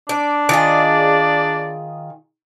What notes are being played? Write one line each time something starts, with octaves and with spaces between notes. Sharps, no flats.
D4 D5
D#3 F4 G#4 D5